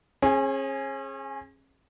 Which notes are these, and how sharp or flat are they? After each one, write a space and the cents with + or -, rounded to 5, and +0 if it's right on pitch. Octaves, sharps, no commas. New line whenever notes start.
C#4 -40 G#4 +0